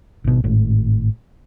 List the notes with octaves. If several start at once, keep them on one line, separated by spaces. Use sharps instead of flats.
G#1 B2
G#1 A2